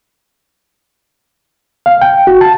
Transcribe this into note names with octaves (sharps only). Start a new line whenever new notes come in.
F5
G5
F#4
A5